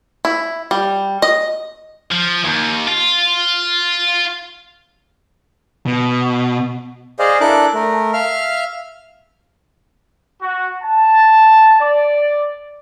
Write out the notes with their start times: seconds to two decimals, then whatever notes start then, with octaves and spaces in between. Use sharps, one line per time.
0.25 E4
0.71 G3
1.22 D#5
2.11 F3
2.44 D#2
2.87 F4
5.86 B2
7.19 G#4 C5 D5 D#5 F5
7.41 D4 E4 A4 A#4 D6 F#6
7.74 A3 A#4
8.13 E5 F5 F6
10.42 F#4
10.82 A5
11.80 D5